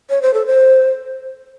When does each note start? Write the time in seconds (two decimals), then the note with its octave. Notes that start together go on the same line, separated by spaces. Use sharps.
0.10 C#5
0.22 C5
0.34 A4
0.46 C5